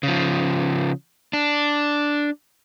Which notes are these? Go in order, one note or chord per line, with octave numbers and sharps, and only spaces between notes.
C#3 F3
D4